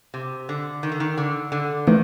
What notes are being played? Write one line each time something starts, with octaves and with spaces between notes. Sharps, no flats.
C3
D3
D#3
D3
D#3
D3
D3
D#3 E3 A3